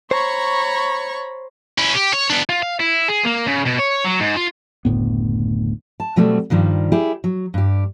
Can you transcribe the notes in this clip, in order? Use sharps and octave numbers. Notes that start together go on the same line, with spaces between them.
C5 C#5 A#5 B5 C#6
C#4 E4
G4
C#5
B3 D4
F4
F5
E4
G#4
A#3
C#3
B2
C#5
F#3
G#2
F4
F#1 D2 A2 B3
A5
B2 F#3 G3 A3 C4
G2 D#3 F3 G3
E4 G4 G#4
F#3
G2 G4